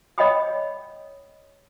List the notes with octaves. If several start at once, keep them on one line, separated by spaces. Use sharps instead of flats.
C#5 D#5 F#5 G5 B5 D#6